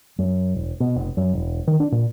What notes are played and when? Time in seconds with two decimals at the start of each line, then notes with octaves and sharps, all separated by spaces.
0.18 F#2
0.54 E1
0.80 B2
0.96 F1
1.17 F#2
1.33 E1
1.67 D#3
1.80 D4
1.92 A#2